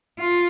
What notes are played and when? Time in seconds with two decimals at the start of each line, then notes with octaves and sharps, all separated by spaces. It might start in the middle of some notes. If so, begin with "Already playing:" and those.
0.19 F4